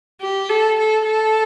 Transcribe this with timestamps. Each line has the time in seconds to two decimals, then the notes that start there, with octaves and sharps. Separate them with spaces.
0.21 G4
0.49 A4
0.79 A4
1.06 A4